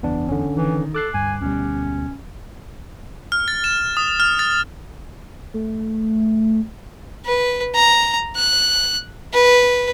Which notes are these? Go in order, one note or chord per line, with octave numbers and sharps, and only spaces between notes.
F#1 E2 B3 D4
D3 C#4
D#3 E3
A4 D6 F#6 C7
D2 G2 G#5
D2 B2 G3 C#4
F6
A6
E7
D#6
F6
A6
A3
B4
A#5
F#6
B4